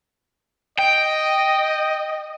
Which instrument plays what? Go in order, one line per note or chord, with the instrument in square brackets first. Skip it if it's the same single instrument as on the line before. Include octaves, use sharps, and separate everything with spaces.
[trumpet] D#5 [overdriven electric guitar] G5